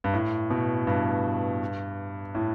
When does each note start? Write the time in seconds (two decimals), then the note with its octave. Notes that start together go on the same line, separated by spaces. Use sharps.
0.04 G2
0.14 A2
0.51 B2
0.87 G2
2.35 A2